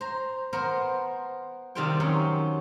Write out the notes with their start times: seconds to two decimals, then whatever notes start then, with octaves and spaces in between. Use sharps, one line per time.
0.01 C5 A#5
0.53 B3 A#4 C5
1.75 C3 D#3 G3 F4 C5 G5
2.00 F#2 D#4 C#5 C6